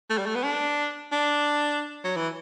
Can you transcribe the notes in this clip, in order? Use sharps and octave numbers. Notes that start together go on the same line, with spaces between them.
A3
G3
A3
B3
D4
D4
F#3
E3